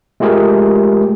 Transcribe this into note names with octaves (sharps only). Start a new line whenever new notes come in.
G#3 A3 F4 G4 G#4 A#4